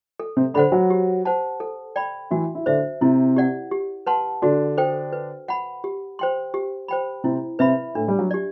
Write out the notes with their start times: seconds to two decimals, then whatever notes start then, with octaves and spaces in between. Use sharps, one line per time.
0.20 A4
0.37 C3 C4
0.54 D3 D4 C5 F#5 B5
0.72 F#3 F#4
0.90 G4
1.25 C5 F#5 A5
1.60 A4
1.96 D5 G5 B5
2.31 E3 E4 F#4
2.55 E4
2.66 D3 D4 C5 E5
3.01 C3 C4 E4
3.36 G4 D5 F#5
3.71 G4
4.07 B4 F#5 A5 C6
4.42 D3 D4 F#4
4.78 A4 C5 G5
5.13 B4
5.48 F#5 B5
5.84 G4
6.19 C5 G5 C6
6.54 G4
6.88 C5 G5 B5
7.24 C3 C4 E4
7.59 C3 C4 B4 E5 B5
7.95 A2 A3 D4
8.08 G3
8.19 F#3
8.31 G4 D5